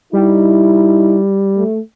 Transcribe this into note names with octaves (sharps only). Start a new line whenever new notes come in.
G3 D#4 E4
A3